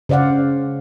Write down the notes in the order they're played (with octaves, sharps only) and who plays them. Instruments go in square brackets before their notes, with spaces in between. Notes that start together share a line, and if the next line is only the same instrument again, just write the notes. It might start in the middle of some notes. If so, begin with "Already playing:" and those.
[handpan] C#3 C5 D5 F5 F#5